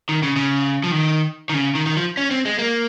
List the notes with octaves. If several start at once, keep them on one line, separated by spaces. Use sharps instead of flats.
D#3
C#3
C#3
F3
D#3
D#3
C#3
D#3
D#3
F3
C#4
C4
G#3
A#3